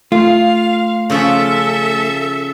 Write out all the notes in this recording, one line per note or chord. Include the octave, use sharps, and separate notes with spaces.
A3 F4 F5
C#3 F3 C#4 A4 E5